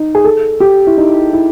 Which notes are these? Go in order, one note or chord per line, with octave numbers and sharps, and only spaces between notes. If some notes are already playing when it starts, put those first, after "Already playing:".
Already playing: D#4
G#4
A4
G4
E4
D#4
E4